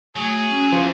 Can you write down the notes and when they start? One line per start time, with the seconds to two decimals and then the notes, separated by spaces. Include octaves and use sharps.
0.16 F#3 A3 G#4
0.51 C#4
0.72 E2 F3